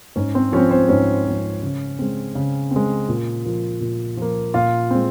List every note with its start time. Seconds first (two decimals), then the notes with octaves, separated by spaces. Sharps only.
0.16 G#2 C#4 C#5
0.35 C4 C5
0.52 F3 C4 C#4 C#5
0.71 C4 C5
0.89 G#2 C#4 C#5
1.25 F3 C4
1.62 C#3
1.99 G#3 C4
2.35 C#3
2.71 G#3 C4
3.09 A#2
3.45 F3 A#3
3.81 A#2
4.17 F3 A#3
4.54 A#2 F4 F5
4.91 G#3 C4